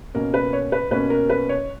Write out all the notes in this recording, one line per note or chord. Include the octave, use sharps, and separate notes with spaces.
B2 A#3 C#4 A#4
B4
C#5
B4
B2 A#3 C#4 B4
A#4
B4
C#5